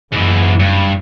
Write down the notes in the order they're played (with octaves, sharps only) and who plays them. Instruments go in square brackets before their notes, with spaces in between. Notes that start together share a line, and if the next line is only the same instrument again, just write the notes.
[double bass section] F#1 [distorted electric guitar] G#2 E3
[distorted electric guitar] G2